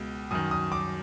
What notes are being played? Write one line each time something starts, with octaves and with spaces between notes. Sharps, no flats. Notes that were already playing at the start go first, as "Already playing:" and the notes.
Already playing: C#2 B2
F#2 D#3 D#6
D#6
D6